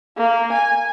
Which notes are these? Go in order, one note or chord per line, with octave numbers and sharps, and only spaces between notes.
A#3
G#5